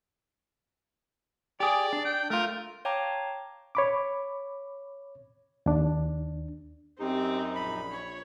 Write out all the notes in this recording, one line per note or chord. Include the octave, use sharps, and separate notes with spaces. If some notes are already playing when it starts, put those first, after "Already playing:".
G4 G#4 D5
D4
G5
A3 F4 A#4
C#5 F5 G5 A5 A#5 D6
C#5 B5 D6
D#2 D4
F#2 C4 D#4 G4
A#1 B5
C#5